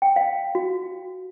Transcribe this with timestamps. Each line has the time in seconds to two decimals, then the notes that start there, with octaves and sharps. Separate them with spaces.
0.02 G5
0.16 F5
0.55 F#4